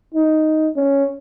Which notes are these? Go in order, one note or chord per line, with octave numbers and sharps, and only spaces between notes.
D#4
C#4